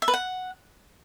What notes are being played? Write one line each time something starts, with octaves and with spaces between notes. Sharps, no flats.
E5
B4
F#5